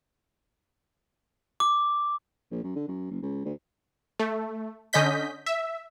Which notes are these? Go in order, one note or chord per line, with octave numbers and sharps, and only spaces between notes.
D6
A#1
F#2
D3
F#2
F#1
C#2
D2
A3
D3 C#4 D#5 G6 B6
E5